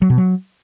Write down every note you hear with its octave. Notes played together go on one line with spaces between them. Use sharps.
F#3
B2
F#3